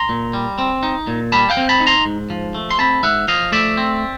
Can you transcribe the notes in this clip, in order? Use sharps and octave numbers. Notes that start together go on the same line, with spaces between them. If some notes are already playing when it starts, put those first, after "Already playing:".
Already playing: A#5 C6
A#2
G3
C4
D#4
A#2
G3 A5 B5
F5 G5
C4
A5 B5
D#4
A#5 C6
G#2
F3
A3
C6
C4 A5 B5
G#2 E5 F#5
F3 D#5 F5
A3 D5 E5
C4